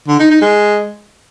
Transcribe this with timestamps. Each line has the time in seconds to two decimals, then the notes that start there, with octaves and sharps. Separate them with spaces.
0.08 D3
0.19 D#4
0.31 D#4
0.42 G#3